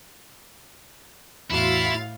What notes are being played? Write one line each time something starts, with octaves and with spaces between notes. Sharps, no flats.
E2 A2 E4 F#4 F5 C6 A6